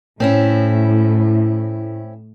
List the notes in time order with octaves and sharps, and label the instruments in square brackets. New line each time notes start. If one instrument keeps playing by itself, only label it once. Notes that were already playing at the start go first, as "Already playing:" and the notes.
[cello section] A2 [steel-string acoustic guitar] C4 C#4 E4